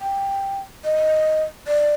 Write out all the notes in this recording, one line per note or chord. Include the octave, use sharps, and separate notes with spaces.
G5
D#5
D5